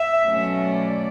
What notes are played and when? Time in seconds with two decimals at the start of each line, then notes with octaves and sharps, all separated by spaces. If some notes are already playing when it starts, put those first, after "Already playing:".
Already playing: E5
0.24 B2 F#3 A3 C#4
0.64 D5